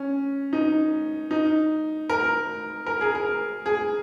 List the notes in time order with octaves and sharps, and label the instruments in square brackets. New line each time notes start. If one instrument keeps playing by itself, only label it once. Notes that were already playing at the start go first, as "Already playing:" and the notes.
Already playing: [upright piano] C#4
D#4
D#4
A#4
A#4
G#4
A#4
G#4